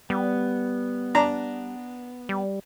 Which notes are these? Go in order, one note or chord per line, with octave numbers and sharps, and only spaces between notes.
G3 B3
D4 A#5
G3